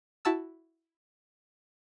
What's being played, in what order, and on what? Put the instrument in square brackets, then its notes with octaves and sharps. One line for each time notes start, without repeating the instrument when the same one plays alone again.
[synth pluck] E4 F#4 A5 E6